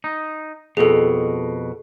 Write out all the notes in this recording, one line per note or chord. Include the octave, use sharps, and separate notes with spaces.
D#4
F2 B2 G#4 A4